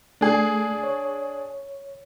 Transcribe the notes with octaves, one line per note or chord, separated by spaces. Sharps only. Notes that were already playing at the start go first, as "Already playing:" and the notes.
A3 D4 G#4
C#5